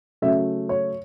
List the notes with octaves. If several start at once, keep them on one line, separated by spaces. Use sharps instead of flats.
C#3 F#3 A3 E5
C#5